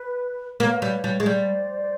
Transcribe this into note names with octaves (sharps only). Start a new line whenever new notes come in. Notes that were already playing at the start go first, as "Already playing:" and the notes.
Already playing: B4
A#3 B4 C#5
G3
G3
G#3
G3 C5 D5